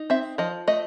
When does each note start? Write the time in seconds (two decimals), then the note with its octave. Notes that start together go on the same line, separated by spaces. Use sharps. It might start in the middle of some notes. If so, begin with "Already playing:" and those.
Already playing: D#4
0.10 C4 E5
0.38 F3 D#5
0.67 A3 D#5